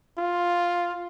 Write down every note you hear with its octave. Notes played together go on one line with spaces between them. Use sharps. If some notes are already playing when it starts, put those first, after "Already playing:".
F4